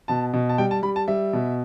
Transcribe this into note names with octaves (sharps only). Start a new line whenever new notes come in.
B2 A5
B2
A5
G3 G5
A5
G3 B5
A5
G3 E5
B2